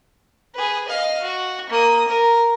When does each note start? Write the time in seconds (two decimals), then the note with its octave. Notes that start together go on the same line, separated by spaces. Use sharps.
0.55 G#4 B4
0.88 D#5 F5
1.22 F#4
1.70 A#3 D#6
2.08 A#4